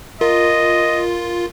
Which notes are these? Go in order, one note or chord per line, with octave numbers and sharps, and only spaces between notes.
F4 A#4 D#5